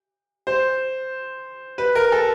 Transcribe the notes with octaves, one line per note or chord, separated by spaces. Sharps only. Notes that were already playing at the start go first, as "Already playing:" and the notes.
C5
B4
A#4
A4